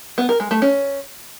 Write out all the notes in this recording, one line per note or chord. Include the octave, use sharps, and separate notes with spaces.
B3
A#4
G#3
A3
C#4